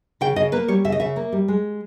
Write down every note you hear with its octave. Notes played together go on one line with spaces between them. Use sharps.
C#3 G5
C#3 D#5
A#3 B4
G3 C#5
C#3 E5
D#5
C#3 E5
A#3
G3
G#3